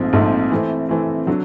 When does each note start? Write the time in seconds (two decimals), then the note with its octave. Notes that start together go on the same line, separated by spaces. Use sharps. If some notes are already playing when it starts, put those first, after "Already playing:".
Already playing: A#1 G#2 F3 A3 C4
0.13 A#1 G#2 F3 A3 C4
0.51 E3 A3 C4
0.89 E3 A3 C4
1.27 D3 F#3